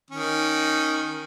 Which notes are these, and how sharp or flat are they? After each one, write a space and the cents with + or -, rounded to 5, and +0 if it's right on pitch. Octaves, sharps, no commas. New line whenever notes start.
D#3 +0 C#4 +0